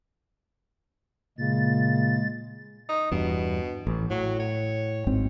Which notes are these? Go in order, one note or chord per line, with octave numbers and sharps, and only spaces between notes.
A#2 C#3 G#3 A6
D#4
E2 G2 B2
A1
A2 F#3
C#5
G#1 G#2 C4